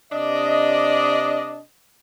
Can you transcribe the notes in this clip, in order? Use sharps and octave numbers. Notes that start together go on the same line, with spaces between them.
C3 D4 D#5